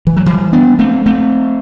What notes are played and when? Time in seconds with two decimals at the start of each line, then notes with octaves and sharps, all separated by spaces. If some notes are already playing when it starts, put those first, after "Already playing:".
0.07 E3
0.17 F#3
0.26 E3 G3
0.53 B3 D4
0.79 A3 C4
1.06 A3 C4